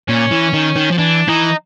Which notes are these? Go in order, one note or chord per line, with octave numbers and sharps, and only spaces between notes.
A#2 C#4
E3
D#3
D#3
F3
E3 D4
E3 D#4